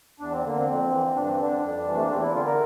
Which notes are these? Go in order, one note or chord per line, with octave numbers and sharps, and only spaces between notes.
E2 D4
C4
D3 A#3
C4
F2
E3
G2 D4
C4
D3 D4
F2
C3 E3 G3
A3
A#3
E2 C4
E4
D3 F4
A#4